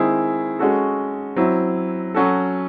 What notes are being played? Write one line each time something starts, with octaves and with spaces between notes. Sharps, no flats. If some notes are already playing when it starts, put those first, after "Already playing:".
Already playing: D#3 G#3 C4 E4 G#4
G#3 C#4 F#4 A4
F#3 C4 E4
F#3 C#4 F#4 A4